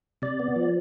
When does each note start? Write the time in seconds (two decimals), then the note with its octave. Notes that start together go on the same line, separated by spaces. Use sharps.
0.22 C3 D5
0.40 B3
0.56 F3